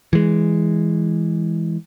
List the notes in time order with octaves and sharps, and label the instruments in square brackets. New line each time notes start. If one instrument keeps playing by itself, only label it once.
[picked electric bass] E3 G#3